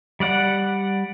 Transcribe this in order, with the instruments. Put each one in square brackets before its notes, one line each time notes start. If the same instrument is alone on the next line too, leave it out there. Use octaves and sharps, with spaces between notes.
[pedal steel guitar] G3 D5 F#5